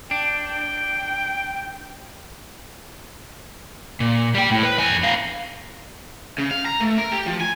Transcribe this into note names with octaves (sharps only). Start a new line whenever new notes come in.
D4 G5
A#2
G3 G5
A2
B4
F2 G#5
B3 F5
C#3
F5
A#5
A3
A#4
G4
F3
G#5